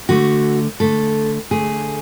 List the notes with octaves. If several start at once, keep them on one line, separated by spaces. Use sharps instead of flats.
D3 A3 F#4
D3 A3 A4
D3 A3 G#4